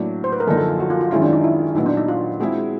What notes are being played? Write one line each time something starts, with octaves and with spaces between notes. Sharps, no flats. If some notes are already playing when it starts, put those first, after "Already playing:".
Already playing: A2 F#3 A#3 D4
C5
B4
A#4
F#2 D3 F3 A#3 D#4 A4
A4
F4
F#4
F4
F4
F#2 D#3 G#3 C#4 E4 F4
D4
D#4
E4
A#2 F#3 B3 D#4
D4
D#4
F4
G#3 C4 E4 F#4 G#4